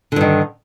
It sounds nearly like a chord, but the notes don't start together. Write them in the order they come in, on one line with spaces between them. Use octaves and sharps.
D3 G2 D#3